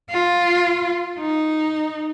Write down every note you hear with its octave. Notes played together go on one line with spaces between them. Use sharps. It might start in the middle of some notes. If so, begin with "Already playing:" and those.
F4
D#4